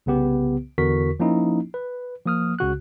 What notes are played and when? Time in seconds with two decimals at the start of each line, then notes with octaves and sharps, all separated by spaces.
0.06 C2 C#3 B3 G4 B4
0.78 E2 D3 F#4 A#4 C#6 B6
1.20 F3 A#3 C#4 D#4 E4
1.74 B4
2.25 F3 A#3 D#6 F6
2.59 C#2 C#3 F#4 F#6